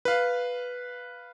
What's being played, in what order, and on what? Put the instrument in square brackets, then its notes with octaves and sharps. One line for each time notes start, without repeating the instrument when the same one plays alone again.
[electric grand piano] B4 F5